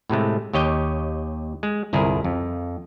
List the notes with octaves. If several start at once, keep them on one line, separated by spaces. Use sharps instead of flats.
A2 C3 G#3 A3
D#2 G4 C#5 D#5 G5
G#3
G1 C2 E4 G#4 A#4
F2